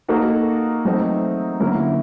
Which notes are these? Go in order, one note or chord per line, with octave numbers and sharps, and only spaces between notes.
A#3 D#4 F#4 A4
F#3 A3 C4 D#4
D3 F#3 A#3 C#4 E4